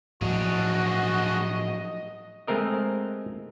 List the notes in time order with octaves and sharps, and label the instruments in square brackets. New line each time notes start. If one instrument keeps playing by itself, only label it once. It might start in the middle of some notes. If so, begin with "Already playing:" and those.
[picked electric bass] A2 F3 F#3 [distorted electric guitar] D4 G#4 [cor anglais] F#4 [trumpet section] D#5
[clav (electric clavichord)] G#3 A3 C4 A#4 D#5